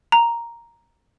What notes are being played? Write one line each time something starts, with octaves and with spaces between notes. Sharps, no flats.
A#5